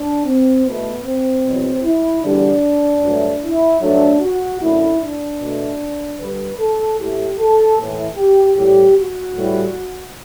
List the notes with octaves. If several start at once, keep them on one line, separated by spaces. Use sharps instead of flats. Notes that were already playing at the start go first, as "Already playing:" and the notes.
Already playing: D4
C4
E2 B2 A3 B3
C4
E2 B2 F#3
E4
E2 D3 G3 D4
G2 F#3 A3
E4
G2 F#3 A3 D4
F#4
F#2 D3 A3 E4
D4
B2 A3
G2 D3 G3 B4
A4
A2 E3 A3 G4
A4
A2 E3 A3
G4
A2 G3 G4
F#4
A2 E3 G3